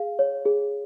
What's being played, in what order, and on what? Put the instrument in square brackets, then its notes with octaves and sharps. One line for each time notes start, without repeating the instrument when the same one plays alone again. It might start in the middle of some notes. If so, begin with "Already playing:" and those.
Already playing: [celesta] G#4 F5
C#5
G#4